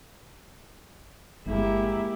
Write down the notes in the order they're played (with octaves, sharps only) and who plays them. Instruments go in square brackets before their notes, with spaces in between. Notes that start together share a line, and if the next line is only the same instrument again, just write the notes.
[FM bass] G1 [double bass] G#3 A#3 [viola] E4 G4